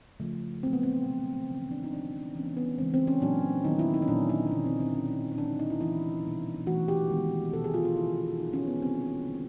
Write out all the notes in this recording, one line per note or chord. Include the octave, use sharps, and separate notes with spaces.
C#3 F3 A3
A#2 F#3 A3 C4
B3
C4
B2 G#3 B3
C#3 E3 A3 C#4
D4
D#4
D#3 F#3 B3 D4
E3 G#3 B3 C#4
B3
C#3 E3 G#3 B3 C4
C4
C#4
A#2 F#3 A#3 D4
D#3 F#3 B3 D#4
E4
D#4
C#4
A#2 F#3 B3 D4
D#4
C#4
D3 F#3 B3 D4
C4
C4
B2 G#3 B3 C#4
C#4
D#3 G#3 B3 D4
D#4
D#4
E4
C3 E3 A3 E4
B2 G3 B3
E3 A3 F#4
G4
D#3 G#3 B3
B2 G#3 B3 A4
G#4
F4
F4
C#3 F3 A3 E4
D#3 F#3 B3 D#4
C#4
B3
C3 D#3 G3 A#3 C4
D3 G3 A#3